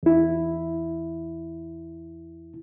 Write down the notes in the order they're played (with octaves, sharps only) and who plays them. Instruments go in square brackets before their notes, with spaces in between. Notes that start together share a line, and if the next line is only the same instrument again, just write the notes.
[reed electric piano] E2 E4